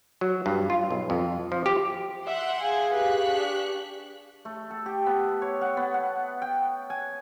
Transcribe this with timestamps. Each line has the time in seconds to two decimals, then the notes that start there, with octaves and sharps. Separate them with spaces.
0.21 F#3
0.46 G2
0.70 F4
0.91 B1
1.10 F2
1.52 F3
1.66 G4
2.26 E5 F#5 G5 C6
2.61 G#4 F5 G#5
2.94 G4 B4 C#6 F#6 B6
3.29 D4
4.45 A3
4.71 A4
4.86 G4
5.06 B3
5.42 C#5
5.61 F#5
5.77 B3
5.94 F#5
6.42 G5
6.90 G#5